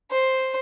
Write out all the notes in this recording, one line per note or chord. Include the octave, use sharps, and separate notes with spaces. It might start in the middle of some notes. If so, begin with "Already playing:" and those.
C5